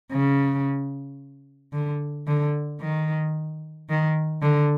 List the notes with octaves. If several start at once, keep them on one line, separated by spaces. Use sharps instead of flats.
C#3
D3
D3
D#3
D#3
D3